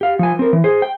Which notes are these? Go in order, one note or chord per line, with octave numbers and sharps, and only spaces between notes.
G4 F5
F3 G#5
C4 A#4
E3
G#4 C5
G5